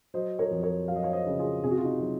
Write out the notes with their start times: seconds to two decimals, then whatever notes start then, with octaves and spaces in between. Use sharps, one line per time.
0.14 F#3 C5 D#5
0.39 A#4 C#5
0.51 F2
0.63 A#4 C#5
0.88 F#3 F5
0.96 D#5
1.03 C#5 F5
1.13 C5 D#5
1.27 C#3
1.39 F4 G#4
1.63 C3 G#4
1.71 F#4
1.77 F4
1.84 D#4 F#4
2.00 F#3 F4